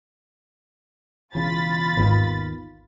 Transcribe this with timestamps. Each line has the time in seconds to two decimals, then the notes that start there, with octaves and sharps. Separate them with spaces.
1.35 E1 E2 C#3 F4 B5 A6
1.97 G#1 D#2 D#3 B3